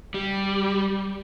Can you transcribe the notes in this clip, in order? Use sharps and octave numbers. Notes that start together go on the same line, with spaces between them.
G3